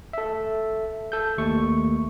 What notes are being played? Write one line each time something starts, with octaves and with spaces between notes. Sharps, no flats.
A4 E5
A4 G6
D#2 A3 C#6